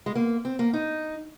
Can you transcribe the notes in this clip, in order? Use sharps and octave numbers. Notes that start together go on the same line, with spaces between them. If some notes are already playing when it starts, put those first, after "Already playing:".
G#3
A#3
C4
A#3
D#4